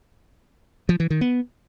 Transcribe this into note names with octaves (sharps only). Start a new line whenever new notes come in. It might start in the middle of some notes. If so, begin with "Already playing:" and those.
F3
E3
D#3
B3